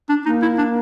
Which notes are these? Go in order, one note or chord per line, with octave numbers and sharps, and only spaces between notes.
D4
A#3 D#4
E4
D4